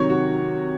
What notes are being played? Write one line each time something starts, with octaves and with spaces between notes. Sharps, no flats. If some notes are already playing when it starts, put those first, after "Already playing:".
Already playing: C3 D#3 F#3 C#5
F#4